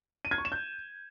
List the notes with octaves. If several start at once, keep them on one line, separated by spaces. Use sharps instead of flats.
D#7
G#6
C#6
E7
G6